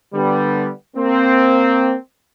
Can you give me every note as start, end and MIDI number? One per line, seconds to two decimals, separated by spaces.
0.14 0.70 50
0.14 0.70 55
0.14 0.70 59
0.96 1.95 58
0.96 1.95 60